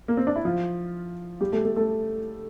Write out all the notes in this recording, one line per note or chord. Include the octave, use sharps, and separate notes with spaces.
A#3
C4
D4
E4
F3 F4
G3 G4
A3 A4
A3 A4
A3 A4